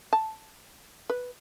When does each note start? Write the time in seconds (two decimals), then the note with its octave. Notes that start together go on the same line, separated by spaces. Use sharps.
0.13 A5
1.10 B4